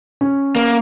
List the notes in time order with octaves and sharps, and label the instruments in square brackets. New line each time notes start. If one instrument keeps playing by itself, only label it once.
[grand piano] C#4
[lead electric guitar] A#3